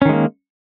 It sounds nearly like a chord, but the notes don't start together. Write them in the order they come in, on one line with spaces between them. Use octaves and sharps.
C#4 D#3 G#3 A#3